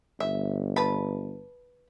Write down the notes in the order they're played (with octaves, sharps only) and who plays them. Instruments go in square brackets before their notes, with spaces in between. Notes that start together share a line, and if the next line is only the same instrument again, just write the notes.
[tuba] G1 [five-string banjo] E5
[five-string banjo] B4 A5 B5